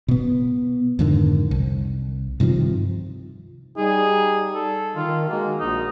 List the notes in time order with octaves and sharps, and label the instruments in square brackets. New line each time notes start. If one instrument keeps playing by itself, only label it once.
[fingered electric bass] B2 B3
F2 G#2 D3 D#3
C2
G2 C3 D#3 F3
[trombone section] G3 D#4 [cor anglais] G#4
[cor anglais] A4
[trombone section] D#3 [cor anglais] F4
[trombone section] D#3 G#3 F#4 [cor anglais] A#3
[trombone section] A#1 [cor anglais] D#4